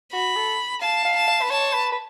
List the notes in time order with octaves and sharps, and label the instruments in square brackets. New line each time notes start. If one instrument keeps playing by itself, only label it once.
[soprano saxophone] F#4 [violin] B5
[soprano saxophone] A4
[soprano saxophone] F5 [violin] A5
[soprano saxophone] F5
[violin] A5
[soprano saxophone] F5
B4
[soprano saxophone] C#5 [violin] A5
[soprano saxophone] B4
B4